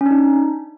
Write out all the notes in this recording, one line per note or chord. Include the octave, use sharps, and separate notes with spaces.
C#4
D4
D#4